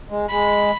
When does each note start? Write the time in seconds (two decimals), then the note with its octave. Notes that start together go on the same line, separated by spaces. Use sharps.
0.10 G#3
0.29 G#3 B5